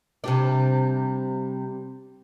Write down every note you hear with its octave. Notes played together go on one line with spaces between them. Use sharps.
C3 G3 D4